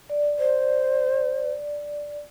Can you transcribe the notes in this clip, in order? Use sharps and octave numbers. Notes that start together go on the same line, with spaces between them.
D5
C5